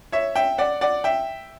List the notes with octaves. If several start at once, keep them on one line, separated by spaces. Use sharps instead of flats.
C#5 E5
E5 G5
D5 F#5
D5 F#5
E5 G5